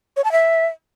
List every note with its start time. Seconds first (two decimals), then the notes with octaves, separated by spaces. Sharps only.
0.16 C#5
0.24 A5
0.32 E5